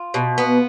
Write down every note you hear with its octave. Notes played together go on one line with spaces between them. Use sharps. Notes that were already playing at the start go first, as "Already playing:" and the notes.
Already playing: F4
B2
B3